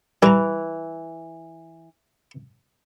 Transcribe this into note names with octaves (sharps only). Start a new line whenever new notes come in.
E3 G3 A#5